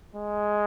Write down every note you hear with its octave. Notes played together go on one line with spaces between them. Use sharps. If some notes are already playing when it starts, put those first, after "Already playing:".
G#3